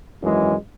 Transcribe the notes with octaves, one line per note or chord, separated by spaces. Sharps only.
G#1 F#2 E3 G#3